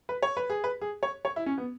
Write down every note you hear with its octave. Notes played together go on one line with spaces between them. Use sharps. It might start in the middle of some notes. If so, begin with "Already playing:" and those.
B4
C#5
B4
G#4
B4
G#4
C#5
C#5
E4
C#4
B3